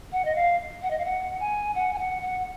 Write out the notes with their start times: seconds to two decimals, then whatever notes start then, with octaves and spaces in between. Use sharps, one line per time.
0.12 F#5
0.25 D#5
0.35 F5
0.82 F#5
0.91 D#5
0.98 F5
1.05 F#5
1.40 G#5
1.75 F#5
1.93 G#5
1.98 F#5
2.22 F#5